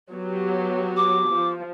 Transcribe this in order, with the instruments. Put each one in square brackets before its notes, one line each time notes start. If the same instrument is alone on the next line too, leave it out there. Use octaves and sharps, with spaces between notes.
[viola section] F#3 B3 G4
[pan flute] D6
[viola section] F3